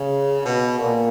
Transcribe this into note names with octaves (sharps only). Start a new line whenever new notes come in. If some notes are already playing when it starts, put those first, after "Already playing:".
Already playing: C#3
B2
A#2